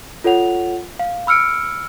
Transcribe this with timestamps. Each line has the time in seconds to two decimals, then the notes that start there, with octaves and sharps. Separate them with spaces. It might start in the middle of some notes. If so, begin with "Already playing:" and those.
0.24 F4 A4 C#5 F#5 F7
0.99 F5
1.27 B5 E6 F6 C#7 D7